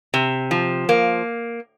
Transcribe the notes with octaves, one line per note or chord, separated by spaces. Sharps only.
C3
F3
A#3